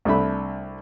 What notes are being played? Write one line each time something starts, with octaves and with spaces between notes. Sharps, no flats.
C2 A3 D4 E5 B5